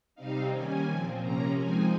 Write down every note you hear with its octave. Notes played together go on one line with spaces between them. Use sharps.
C3 G3 C4 D#4 F5
D#3 G3 A#3 C#4 G#5
A#2 F3 C4
C3 F3 A#3 C#4 A#5
F3 G#3 C4 D#4 G#5